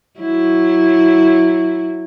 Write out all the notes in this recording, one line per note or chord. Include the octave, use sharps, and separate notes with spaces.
F#3 E4